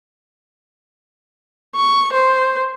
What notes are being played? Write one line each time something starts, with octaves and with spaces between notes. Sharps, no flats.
C#6
C5